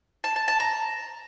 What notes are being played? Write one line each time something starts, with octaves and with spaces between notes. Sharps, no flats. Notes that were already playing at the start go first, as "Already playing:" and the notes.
A5
A5
A5
A#5